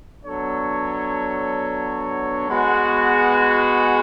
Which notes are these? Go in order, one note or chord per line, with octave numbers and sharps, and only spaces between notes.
F#3 B3 D4 A4 C#5
G#3 B3 F#4